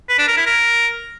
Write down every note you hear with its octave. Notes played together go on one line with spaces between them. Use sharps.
B4
D4
A#4
E4
A#4